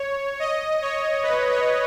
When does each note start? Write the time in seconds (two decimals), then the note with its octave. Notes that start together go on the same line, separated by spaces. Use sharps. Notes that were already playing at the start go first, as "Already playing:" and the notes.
Already playing: C#5
0.39 D#5
0.82 C#5
1.23 B4
1.51 C#5